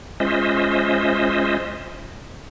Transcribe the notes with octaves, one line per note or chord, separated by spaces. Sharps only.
G#3 C#4 F4 C5 D#5 E5